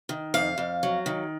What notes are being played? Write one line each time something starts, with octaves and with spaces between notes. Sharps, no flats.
D#3
F2 F5
F2
F#3
D#3